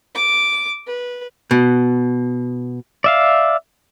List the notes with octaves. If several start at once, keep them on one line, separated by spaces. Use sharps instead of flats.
D6
B4
B2
D5 E5 F5